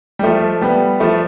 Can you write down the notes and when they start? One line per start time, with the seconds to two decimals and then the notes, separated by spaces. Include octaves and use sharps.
0.19 G3
0.23 F3 A3
0.61 G3 B3
1.00 F3 A3